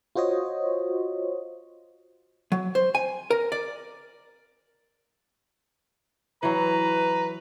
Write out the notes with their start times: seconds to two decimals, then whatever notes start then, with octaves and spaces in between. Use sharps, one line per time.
0.15 F4 F#4 C5 C#5 D#5
2.52 F#3
2.75 C5
2.95 G#5
3.30 A#4
3.52 D5
6.43 E3 F#3 B4 A#5